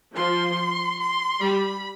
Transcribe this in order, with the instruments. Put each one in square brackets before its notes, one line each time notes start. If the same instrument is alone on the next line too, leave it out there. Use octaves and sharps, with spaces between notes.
[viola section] F3 [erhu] C6
[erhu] C6
[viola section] G3 [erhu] B5